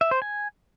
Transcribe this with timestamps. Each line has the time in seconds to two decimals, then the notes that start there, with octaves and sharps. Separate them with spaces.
0.01 E5
0.11 C5
0.22 G#5